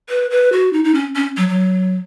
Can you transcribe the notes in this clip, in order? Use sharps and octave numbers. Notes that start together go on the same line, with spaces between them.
B4
B4
F#4
D#4
D#4
C#4
C#4
F#3
F#3